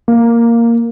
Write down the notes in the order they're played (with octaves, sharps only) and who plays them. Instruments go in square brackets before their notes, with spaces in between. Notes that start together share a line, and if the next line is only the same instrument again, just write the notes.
[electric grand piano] A#3